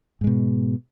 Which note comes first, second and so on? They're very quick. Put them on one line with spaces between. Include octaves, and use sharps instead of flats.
G#2 G#3 B2